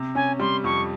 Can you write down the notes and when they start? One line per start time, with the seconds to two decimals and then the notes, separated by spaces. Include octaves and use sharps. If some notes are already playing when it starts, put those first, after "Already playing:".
Already playing: C3
0.15 C#4 G#5
0.39 G3 C6
0.64 F2 C#6